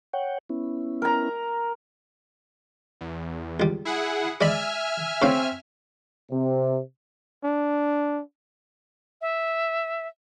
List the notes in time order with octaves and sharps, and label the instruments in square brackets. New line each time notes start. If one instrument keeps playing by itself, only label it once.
[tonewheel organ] C#5 F#5 G5
B3 C#4 E4
[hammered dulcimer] A#4 A#5
[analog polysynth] E2
[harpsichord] C#2 G3
[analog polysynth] E4 G#4 F#5
[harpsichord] G#3 B5 [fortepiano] D5 [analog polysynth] E5 G#5 F6
[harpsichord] C#3 F5 [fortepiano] C4 C#5
[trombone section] C3
[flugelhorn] D4
[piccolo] E5